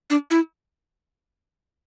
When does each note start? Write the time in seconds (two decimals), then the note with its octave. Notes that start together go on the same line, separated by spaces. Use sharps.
0.10 D4
0.31 E4